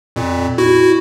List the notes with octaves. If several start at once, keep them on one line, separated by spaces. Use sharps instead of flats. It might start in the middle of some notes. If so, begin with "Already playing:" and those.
F2 A#2
E4 F#4